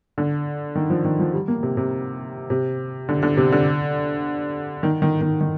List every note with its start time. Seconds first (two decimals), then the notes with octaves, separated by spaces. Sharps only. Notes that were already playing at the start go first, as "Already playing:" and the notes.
0.18 D3
0.75 D#3
0.90 F3
1.04 D#3
1.19 F3
1.34 G3
1.48 A#3
1.63 C3
1.77 C3
2.50 C3
3.09 D3
3.23 D3
3.37 C3
3.52 D3
4.83 D#3
5.02 D#3
5.21 D#3
5.41 D#3